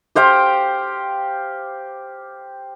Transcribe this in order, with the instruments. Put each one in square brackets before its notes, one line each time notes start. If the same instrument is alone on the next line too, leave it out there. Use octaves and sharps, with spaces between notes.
[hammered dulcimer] G4 C5 F5 G5